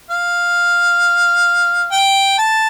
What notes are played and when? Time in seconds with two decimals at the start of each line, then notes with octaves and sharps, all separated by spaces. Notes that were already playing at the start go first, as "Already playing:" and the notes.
0.10 F5
1.92 G5
2.38 A5